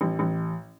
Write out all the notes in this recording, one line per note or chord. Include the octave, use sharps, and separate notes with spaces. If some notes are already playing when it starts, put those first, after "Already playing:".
A1
A1